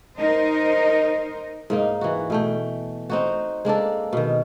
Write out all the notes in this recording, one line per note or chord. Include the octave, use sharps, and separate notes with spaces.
D#4 A#4 C5 D#5
G#2 A#3 D#4
E3 F#4
B2 A3 G5
C4 D#4 F#4
G#3 A#3 D4 A4
B2 D#3